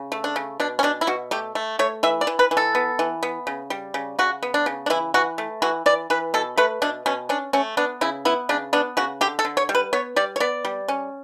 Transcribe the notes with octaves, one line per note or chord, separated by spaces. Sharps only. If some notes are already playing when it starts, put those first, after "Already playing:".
Already playing: C#3
A3
D4
C#3
B2 D4
C#4
B2 D4
E4
B2 F#4
A3 G4
A3
A3 C#5
E3 E5
D5
E3
B4
E3
A4
B3
E3
B3
C#3
G3
C#3
C#3 F#4
B3
D4
C#3
D4
E3 E4
E3 F#4
A3
E3 F#4
E3 D5
E3 B4
B2 A4
A3 B4
B2 D4
B2 C#4
C#4 D4
A3 C#4
B3 D4
C#3 E4
B3 E4
C#3 D4
B3 D4
C#3 F#4
D3 G4
A4
D3
C#5
G3
B4
B3 C#5
G3 D5
C#5
B3 D5
G3
C#4